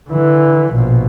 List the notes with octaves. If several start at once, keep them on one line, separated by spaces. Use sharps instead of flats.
D3 E3
A#1 B2